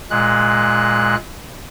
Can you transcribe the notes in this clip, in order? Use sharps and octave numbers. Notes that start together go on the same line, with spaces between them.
A#2 G#3 F#6